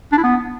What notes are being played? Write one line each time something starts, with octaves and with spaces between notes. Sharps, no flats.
D4
E4
B3